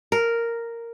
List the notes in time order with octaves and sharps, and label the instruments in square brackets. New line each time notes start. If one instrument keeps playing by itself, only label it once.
[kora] A#4